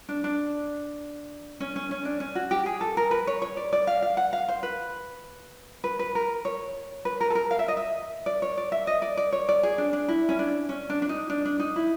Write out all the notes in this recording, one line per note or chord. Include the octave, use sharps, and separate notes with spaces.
D4
D4
C#4
C#4
C#4
D4
C#4
F#4
G4
G#4
A4
A#4
B4
C#5
C#5
D5
D5
F5
F5
F#5
F5
C5
B4
B4
B4
A#4
C#5
B4
A#4
A4
A#4
F5
E5
D#5
E5
D5
C#5
D5
E5
D#5
D5
D5
C#5
D5
G#4
D4
D4
E4
C#4
D4
C#4
D4
D4
D#4
D4
D4
D#4
E4